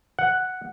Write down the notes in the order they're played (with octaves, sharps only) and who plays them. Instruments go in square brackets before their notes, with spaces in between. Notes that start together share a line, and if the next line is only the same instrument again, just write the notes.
[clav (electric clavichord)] F#5